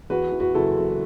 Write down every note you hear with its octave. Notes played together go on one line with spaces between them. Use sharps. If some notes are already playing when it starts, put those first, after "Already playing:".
E2 F#4 B4
E3
F#4 B4
F#1 E4 A4
F#1